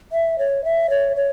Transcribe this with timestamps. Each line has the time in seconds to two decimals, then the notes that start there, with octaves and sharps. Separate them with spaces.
0.12 E5
0.39 C#5
0.64 E5
0.90 C#5
1.16 C#5